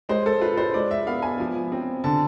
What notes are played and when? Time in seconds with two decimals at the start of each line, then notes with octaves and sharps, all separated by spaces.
0.09 G#3 C5
0.26 A4
0.41 F4 B4
0.57 C5
0.74 G#3 D5
0.91 E5
1.07 B3 F5
1.22 G#5
1.40 F3
1.72 C4
2.04 D3 A5